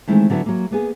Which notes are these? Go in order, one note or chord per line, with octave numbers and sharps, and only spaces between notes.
D#3 E3 G#3 A3 C4
D3 F#3 B3 E4
F#3 A#3
A#3 B3 G#4